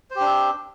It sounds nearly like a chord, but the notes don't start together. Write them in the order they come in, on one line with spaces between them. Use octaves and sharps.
C5 G4 D4 C4